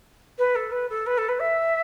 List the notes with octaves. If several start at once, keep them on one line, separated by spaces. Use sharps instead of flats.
B4
A4
B4
A4
B4
A4
B4
E5